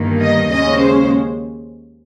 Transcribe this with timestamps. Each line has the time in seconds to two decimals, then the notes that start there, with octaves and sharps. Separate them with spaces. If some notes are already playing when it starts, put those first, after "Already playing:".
Already playing: G1 G2 D#3 A#3
0.20 D#5
0.49 D#2 C#3 G#3 C#4 D#5
0.79 C5